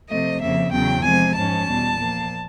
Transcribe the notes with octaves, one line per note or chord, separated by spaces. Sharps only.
C3 F3 A3 D#5
F2 C#3 F3 A#3 E5
E2 C#3 F#3 B3 G5
C3 F3 G#3 G#5
G#2 F3 G#3 C#4 A5
E2 B2 G3
A#2 F3 A#3